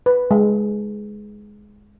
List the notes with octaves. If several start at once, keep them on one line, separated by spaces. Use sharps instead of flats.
B4
G#3